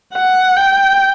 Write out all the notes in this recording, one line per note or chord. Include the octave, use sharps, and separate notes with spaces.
F#5
G5